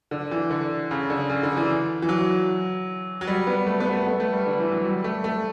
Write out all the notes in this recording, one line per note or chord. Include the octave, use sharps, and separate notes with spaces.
D3
E3
D3
C#3
D3
C#3
D3
E3
E3
F#3
F#3
G3
B3
A3
B3
A3
B3
A3
G3
D3
E3
F#3
G3
A3
A3